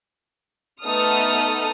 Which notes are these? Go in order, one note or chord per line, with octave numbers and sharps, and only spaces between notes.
A3 B3 D#4 A4 D#6 F6